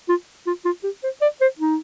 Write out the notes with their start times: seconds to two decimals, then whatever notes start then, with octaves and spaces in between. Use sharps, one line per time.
0.09 F4
0.47 F4
0.65 F4
0.84 G4
1.03 C5
1.22 D5
1.41 C5
1.59 D#4